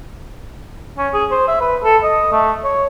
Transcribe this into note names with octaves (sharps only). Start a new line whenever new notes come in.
C#4
G#4
C5
E5
B4
A4
D#5
A3
C#5